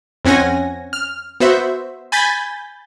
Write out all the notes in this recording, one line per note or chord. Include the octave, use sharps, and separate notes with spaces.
F2 C4 C#4 F#5 G#5 A#6
F6
B3 F#4 C5 E5
G#5 B5 G6 A6 B6